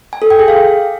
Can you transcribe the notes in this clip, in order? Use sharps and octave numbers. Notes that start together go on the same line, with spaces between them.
G#5
A4
G5
G#4
F5